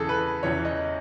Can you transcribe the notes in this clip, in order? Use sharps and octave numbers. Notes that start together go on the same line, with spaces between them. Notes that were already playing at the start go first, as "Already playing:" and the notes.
Already playing: E2 C#3 E3 G#4 A4
B4
E2 C#3 E3 C#5
D#5